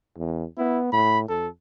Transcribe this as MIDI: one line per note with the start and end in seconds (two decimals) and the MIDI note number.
0.18 0.44 40
0.58 0.90 59
0.58 0.79 64
0.92 1.25 45
0.92 1.19 83
1.29 1.49 41
1.29 1.48 69